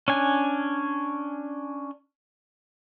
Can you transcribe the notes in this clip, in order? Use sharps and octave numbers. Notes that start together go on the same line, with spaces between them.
C#4 D4 G#5